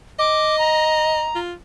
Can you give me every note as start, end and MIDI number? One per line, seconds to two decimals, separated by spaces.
0.19 1.29 75
0.19 0.58 86
0.59 1.39 82
1.35 1.53 65